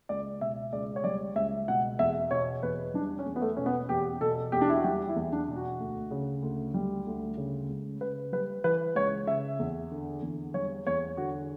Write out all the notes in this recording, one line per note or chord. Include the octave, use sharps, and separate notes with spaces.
C#2 D5
B2 E5
C#2 D5
C#5
G3 D5
C#2 E5
B2 F#5
E2 E5
B2 C#5
E2 B4
G3 D4
C#4
E2
B3
A3
B2 C#4
B3
E2 G4
B2 A4
E2 G4
D4
E4
F#4
G3 G4
E4
E2
D4
B2
F#4
D2
C#3
D2
G3
D2
C#3
C#2
C#3 B4
G3 B4
E3 B4
C#2 C#5
C#3 E5
E2
D3
E2
G3 C#5
E2 C#5
D3 F#4